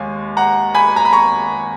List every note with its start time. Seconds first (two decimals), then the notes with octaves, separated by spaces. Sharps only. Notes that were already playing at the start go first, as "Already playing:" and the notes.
Already playing: D#2 G#3 F5 G#5
0.37 F#5 A#5
0.75 G#5 B5
0.96 A#5
1.05 B5
1.13 A#5 C#6